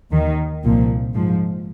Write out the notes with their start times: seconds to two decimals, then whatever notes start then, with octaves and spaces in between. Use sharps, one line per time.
0.12 D#2 D#3
0.63 C2 A#2 F3
1.14 G#2 F3